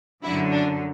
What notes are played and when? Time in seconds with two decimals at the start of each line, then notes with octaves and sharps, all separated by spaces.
0.23 F#2 D3 F#3 E4
0.51 D4